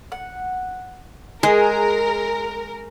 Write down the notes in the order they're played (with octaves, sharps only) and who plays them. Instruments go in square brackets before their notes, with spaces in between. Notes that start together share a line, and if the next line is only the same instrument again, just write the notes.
[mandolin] F#5
[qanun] G#3 [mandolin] G#4 [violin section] A#4